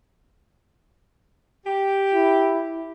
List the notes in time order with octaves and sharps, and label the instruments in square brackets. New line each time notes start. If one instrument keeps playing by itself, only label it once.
[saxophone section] G4
[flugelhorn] E4